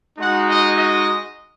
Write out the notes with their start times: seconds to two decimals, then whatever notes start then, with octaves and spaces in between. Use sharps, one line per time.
0.18 G#3 D#4 F#4 F#5
0.47 D#5
0.75 D#5